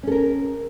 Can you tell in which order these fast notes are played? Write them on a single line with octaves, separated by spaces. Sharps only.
C#4 A4 A#4